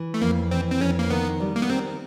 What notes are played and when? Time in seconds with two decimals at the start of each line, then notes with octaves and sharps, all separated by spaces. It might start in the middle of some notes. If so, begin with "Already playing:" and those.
Already playing: E3
0.14 A3
0.21 F2 A#3
0.51 E3 C4
0.70 C4
0.81 F2 C#4
0.99 A#3
1.10 D#3 B3
1.40 G3
1.56 A#3
1.62 B3
1.70 D#3 C4